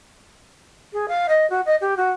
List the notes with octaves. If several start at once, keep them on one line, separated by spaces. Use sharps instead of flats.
G#4
F5
D#5
F#4
D#5
G4
F#4